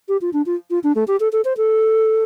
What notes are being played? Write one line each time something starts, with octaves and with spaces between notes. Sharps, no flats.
G4
F4
D4
F4
F4
D4
A3
G4
A4
A4
C5
A4